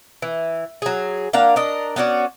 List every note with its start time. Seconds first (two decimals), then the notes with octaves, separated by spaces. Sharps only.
0.22 E3
0.82 F#3 G#4
1.33 A#3 D4 F5 F#5
1.56 D4 A#4 D#5
1.96 B3 C#4 F#4 D5